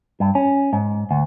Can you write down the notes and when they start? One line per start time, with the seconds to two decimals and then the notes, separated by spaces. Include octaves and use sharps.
0.20 G2
0.35 C#4
0.73 G#2
1.11 D2